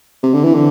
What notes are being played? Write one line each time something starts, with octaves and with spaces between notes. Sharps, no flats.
C3
D3
E3
D3